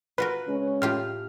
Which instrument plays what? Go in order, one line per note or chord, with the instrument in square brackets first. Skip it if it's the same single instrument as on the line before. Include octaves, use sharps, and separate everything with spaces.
[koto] F4 F#4 A#4 [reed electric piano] B4
[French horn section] C#3 G#3 C#4
[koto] A2 F4 G4 [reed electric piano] F6